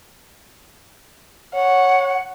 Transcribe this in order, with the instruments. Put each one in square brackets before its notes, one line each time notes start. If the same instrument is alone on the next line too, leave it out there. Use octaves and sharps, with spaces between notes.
[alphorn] C#5 [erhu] F#5